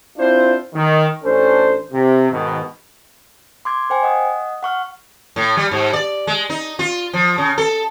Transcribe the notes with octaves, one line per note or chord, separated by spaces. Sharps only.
C4 D4 E4 F4 C5
D#3
A1 C#4 D4 A4 C5
C3
G#2 B2 D#3
C6 D6 G#6
C5 G5 G#5
D#5 F#5 D#6
F#5 C#6 F6
A2
G3
G#2
D5
G#3
D#4
F4
F3
C#3
A4